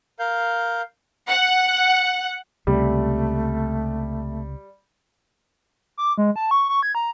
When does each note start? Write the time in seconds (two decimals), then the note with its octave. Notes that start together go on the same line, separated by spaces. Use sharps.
0.19 A#4 F5 G6
1.29 F#5
2.67 C#2 C3 G3 A3
5.98 D6
6.18 G#3
6.36 A5
6.51 C#6
6.69 C#6
6.83 G#6
6.95 A#5